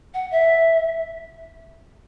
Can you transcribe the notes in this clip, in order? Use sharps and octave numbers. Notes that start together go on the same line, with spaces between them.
F#5
E5